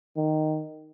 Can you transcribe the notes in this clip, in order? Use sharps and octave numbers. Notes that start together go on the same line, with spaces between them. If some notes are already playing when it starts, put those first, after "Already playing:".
D#3